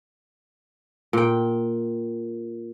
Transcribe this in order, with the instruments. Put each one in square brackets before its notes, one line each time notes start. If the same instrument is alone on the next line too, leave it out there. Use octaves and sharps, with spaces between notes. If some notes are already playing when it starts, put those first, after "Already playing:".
[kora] A#2 G5